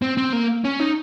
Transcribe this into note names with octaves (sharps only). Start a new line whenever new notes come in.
C4
C4
A#3
C#4
D#4